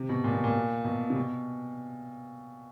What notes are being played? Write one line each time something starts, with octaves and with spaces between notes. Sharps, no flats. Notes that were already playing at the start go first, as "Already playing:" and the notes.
Already playing: C3
B2
A#2
B2
A#2
B2
C3
B2